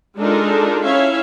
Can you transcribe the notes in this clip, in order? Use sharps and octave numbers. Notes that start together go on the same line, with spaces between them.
G#3 D4 D#4 F4 A4 A#4
C#4 E4 C#5 E5 F5